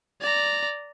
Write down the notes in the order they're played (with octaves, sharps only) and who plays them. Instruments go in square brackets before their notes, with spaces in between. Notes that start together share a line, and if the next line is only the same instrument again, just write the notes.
[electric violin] D5 A#5